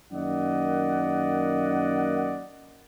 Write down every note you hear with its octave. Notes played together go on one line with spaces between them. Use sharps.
F#2 D#3 A#3 D5 D#5 F#5